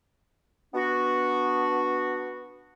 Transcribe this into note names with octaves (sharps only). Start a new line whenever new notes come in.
B3 D4 F#4